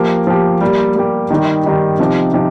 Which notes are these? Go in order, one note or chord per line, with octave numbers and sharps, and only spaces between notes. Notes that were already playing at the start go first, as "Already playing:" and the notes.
Already playing: F3 A#3 G4
F3 A#3 G4
G3 A#3 G4
G3 A#3 G4
D#3 G3 D#4 G4
D#3 G3 D#4 G4
C3 F3 D#4 G4
C3 F3 D#4 G4